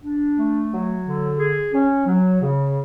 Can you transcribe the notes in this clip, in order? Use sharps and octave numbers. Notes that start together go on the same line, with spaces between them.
D4
A3
F#3
D3
G#4
C#4
F#3
C#3